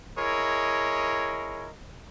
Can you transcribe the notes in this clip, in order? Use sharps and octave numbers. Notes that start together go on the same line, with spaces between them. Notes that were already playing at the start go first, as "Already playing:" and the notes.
E4 G#4 A#4 C#5 D#5